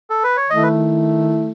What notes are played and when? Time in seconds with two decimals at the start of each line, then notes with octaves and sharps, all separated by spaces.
0.10 A4
0.23 B4
0.37 C#5
0.50 D#3 A3 E4 D#5
0.63 B4